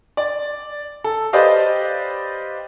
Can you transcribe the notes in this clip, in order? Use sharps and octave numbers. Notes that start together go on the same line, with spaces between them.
D5
A4
G4 B4 C5 D5 D#5 F5